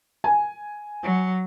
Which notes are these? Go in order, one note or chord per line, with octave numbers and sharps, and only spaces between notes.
G#5
F#3